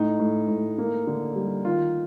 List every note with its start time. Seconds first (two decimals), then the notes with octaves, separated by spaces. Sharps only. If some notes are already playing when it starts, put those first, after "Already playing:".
Already playing: A2 D#4
0.20 A2
0.49 A2
0.78 A#3
1.07 D3
1.36 G3
1.65 D#3 F4